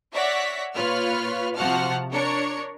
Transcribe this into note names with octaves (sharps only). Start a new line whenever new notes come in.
C#5 D5 E5 F#5 A#6 B6
A#2 F4 B4 C#5 F6
C3 F3 F#4 F#5 A5 F6
D4 A#4 C#5 C#7